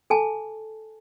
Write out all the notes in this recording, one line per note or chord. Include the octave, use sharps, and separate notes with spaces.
A4 G#5 A5